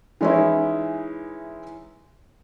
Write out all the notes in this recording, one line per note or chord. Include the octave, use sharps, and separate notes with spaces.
E3 G#3 C#4 D#4 E4